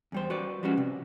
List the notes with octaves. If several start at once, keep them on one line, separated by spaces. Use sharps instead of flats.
E2 G3 C5
F#4 B4 D5
F3 G3 G#3 C#4 F#4
C3